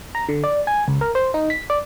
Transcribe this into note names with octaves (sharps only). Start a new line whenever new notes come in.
A#5
D3
D5
G#5
C#2
A#4
C5
D#4
B6
D5